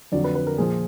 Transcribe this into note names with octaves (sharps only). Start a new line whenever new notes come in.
F2 D3 F#3 D5
B4
B4
A#4
A#2 F3 G#4